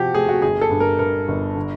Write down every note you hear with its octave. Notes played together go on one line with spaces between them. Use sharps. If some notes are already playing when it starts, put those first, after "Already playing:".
Already playing: C3 F3 F#4 G4
A3 G#4
F#4
G1 G#4
A4
G2
A#4
G2 A#4
G1
D3